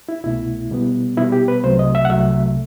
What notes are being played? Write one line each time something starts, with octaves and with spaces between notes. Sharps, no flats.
E4
C2 B2 A3 E4
B2 G3 B3
B2 G3 B3 E4
G4
B4
C2 C3 F#3 A3 C5
D#5
E5
F#5
C2 C3 F#3 A3 E5